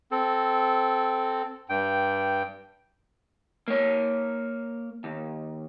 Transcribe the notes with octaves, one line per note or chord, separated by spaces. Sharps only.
C4 A4
G2 G5
A#3 C#5
D#2